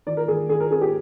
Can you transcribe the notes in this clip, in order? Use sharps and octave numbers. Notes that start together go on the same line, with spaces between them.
D#3 D5
A#4
D#3 G#4
D#3 G#4
A#4
C4 G#4
G4